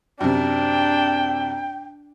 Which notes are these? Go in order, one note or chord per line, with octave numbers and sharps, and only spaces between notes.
F#2 C3 D4 G5